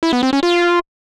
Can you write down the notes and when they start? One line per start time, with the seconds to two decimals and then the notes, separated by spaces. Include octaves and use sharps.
0.03 E4
0.13 B3
0.23 C4
0.33 C#4
0.43 F4